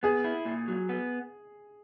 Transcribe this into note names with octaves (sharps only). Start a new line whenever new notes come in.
B3 G#4
E4
A#2
F#3
B3